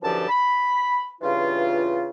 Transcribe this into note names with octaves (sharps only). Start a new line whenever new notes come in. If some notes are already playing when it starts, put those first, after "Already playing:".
F#2 D3 E3 F3 G4 A5
B5
G2 C#3 E3 F4